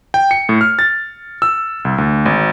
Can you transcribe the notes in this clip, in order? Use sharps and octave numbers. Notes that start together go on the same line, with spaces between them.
G5
C#7
A2
F6
A6
E6
C2
D2
G#1